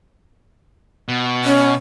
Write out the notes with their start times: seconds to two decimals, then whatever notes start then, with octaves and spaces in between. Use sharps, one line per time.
1.08 B2
1.44 C#4